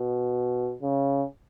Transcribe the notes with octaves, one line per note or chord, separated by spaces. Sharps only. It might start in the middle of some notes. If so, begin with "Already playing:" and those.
Already playing: B2
C#3